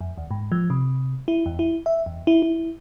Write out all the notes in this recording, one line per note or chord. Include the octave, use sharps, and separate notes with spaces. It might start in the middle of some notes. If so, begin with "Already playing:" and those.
F2
D#2
G#2
F3
C3
E4
E2
E4
E5
E2
E4
E4